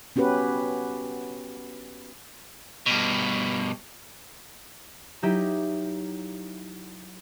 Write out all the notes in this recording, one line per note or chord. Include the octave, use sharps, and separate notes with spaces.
B3 C#4 F#4 G4 B4
G2 B2
F#3 D#4 E4 G4